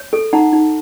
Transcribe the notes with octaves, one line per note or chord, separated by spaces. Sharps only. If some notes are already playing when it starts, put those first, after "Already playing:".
Already playing: C#5
A4
D#4 F#5 A#5
D#4